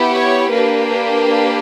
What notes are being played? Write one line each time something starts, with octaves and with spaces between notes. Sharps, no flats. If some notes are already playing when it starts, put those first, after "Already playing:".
Already playing: B3 E4 G4
C#5
A#3 D4 G4 B4
B4